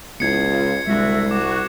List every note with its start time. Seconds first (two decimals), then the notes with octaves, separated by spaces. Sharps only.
0.20 C#2 B3 E4 G#6 C7 C#7
0.50 F4 D#5 F5
0.87 C2 D3 G#3 D4 F#4 E5
1.31 F#4 D6